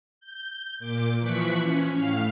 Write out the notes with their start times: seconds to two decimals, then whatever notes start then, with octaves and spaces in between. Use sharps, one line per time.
0.20 G6
0.78 A#2 D6
1.19 E3 F3 C#6 F#6 B6
1.61 C#4
1.91 A2 F5 F6